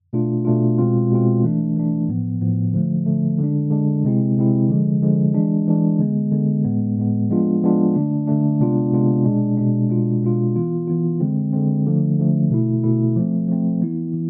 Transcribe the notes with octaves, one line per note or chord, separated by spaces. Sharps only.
B2 A3 D4 F4
B2 A3 D4 F4
B2 G#3 C4 F4
B2 G#3 C4 F4
E3 A3 D4
E3 A3 D4
A2 F3 B3
A2 F3 B3
D3 F3 A3
D3 F3 A3
D3 G#3 D4
D3 G#3 D4
C3 G#3 C4 E4
C3 G#3 C4 E4
D3 F3 G#3
D3 F3 G#3
E3 G#3 D4
E3 G#3 D4
D3 G#3 B3
D3 G#3 B3
A2 G#3 B3
A2 G#3 B3
F3 G#3 B3 D4 F4
F3 G#3 B3 D4 F4
D3 A3 D4
D3 A3 D4
C3 G#3 B3 D4 F4
C3 G#3 B3 D4 F4
B2 G#3 D4
B2 G#3 D4
B2 G#3 D4 F4
B2 G#3 D4 F4
E3 B3 F4
E3 B3 F4
D3 G#3 C4
D3 G#3 C4
D3 F3 A3
D3 F3 A3
B2 A3 E4
B2 A3 E4
F3 A3 C4
F3 A3 C4
E3 B3 E4
E3